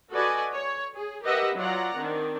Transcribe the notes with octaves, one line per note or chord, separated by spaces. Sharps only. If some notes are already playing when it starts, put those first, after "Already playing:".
F#4 A4 B4 D5 D#5 G#5
C#5
G#4
G4 A#4 B4 D#5 E5 F#5
F#3 F4 D5 F#5 A#5
D#3 C4 D4